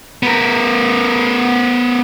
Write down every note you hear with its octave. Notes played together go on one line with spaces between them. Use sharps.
B3 A#4